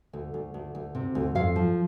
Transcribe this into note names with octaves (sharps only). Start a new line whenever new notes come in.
D2
D2
D2
D2
C3
D2
F2 F5
F3